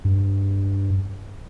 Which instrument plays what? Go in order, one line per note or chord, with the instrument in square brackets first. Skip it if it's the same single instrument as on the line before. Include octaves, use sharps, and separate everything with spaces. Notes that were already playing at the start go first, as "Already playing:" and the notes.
[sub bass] G2